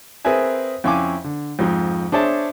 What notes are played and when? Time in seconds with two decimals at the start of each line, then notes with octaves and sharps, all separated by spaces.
0.25 C4 G#4 A#4 B4 E5 G#5
0.84 F2 C#4 E4 F5 G#5 D6
1.24 D3
1.59 F2 G#2 F3
2.12 D4 G#4 C5 C#5 E5 A5